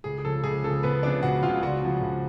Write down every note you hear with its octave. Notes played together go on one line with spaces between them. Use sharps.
C#2 G#4
G#4
C#3 F3 A4
C#2 G#4
C#3 F3 A4
C#2 B3 B4
C#3 F3 D4 D5
C#2 F#4 F#5
C#3 F3 F4 F5
C#2 F#4 F#5
C#3 F3
C#2